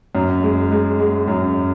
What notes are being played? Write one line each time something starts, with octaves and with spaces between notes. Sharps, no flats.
F#2
G#3
G#3
G#3
F#2